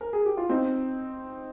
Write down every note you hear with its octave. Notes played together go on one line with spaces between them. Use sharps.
A#4
G#4
G4
F4
C4 D#4